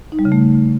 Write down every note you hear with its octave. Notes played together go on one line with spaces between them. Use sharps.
D#4
G3
C#3
A3